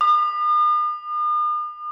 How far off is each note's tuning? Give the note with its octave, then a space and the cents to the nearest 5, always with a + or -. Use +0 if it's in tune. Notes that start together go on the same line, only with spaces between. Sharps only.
D#6 -45